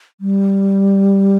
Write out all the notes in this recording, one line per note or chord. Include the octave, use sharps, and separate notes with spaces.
G3